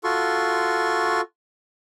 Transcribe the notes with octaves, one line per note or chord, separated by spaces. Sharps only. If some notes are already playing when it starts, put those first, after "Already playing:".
F4 F#4 A4 C6 C#6